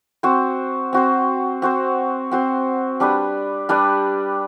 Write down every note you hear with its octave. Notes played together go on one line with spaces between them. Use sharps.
C4 F#4 C5
C4 F#4 C5
C4 F#4 C5
C4 F#4 C5
G3 D4 G4 B4
G3 D4 G4 B4